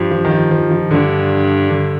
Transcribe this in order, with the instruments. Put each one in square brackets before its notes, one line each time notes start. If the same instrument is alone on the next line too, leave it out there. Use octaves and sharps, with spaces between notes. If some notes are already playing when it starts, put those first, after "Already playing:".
Already playing: [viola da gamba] G2 [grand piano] F3 G3
[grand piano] F3
D#3
F3
F3
F3
[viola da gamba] G2 [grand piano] D3
[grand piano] D3